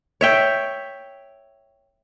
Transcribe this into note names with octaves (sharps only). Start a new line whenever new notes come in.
C#5 E5 G5